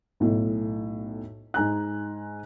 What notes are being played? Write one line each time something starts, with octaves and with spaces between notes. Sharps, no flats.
B1 A2
G#2 G#5 A#5 F#6